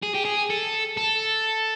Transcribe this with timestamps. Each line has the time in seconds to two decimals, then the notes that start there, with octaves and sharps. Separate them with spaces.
0.03 G#4
0.14 G4
0.25 G#4
0.50 A4
0.97 A4